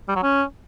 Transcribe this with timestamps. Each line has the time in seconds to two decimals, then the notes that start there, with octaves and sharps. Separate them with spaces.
0.08 G3
0.16 F#3
0.23 C#4